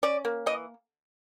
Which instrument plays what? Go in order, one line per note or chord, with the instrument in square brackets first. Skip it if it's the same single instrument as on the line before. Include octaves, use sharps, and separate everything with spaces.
[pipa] C#4 D5
A#3
E3 D#5